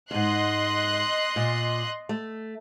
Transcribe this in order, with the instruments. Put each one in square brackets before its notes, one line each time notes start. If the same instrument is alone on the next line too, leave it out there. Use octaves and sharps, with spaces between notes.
[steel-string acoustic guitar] F2 G#2 [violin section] D#5 C6 F#6
[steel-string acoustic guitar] A#2
A3